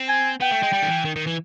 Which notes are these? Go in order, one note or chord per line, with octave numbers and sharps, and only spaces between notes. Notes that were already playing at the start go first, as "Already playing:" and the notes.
Already playing: C4
G#5
B3 G5
A3
G#3
G3
D#3
E3
D#3
D#3
E3